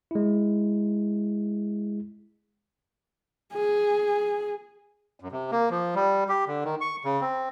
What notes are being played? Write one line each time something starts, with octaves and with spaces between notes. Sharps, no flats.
G#3 E4
G#4
F#2
C3
A#3
F3
G3
G4
D3
D#3
C#6
C#3
C4